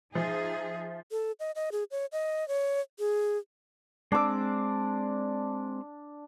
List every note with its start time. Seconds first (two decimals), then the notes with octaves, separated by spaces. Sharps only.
0.15 F3 D#4 G#4 E5
1.11 A4
1.40 D#5
1.55 D#5
1.72 G#4
1.91 C#5
2.12 D#5
2.48 C#5
2.99 G#4
4.12 G#3 C4 D4 D6 E6